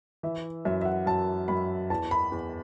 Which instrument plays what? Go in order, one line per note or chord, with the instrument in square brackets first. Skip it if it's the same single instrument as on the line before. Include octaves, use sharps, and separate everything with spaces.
[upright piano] E3 E5
F#2 E5
E5
F#5
F#2 A5
F#2 B5
E2 A5
B5
E2